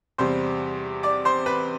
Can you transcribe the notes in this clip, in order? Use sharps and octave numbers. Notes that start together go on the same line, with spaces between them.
E2 C3 G3 C5 C6
D5 D6
C5 C6
B4 B5